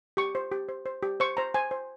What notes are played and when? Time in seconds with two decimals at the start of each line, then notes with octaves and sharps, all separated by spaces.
0.17 G4 C#6
0.35 C5
0.52 G4
0.69 C5
0.86 C5
1.03 G4
1.20 C5 C#6
1.37 C5 A#5
1.54 C5 G#5
1.71 C5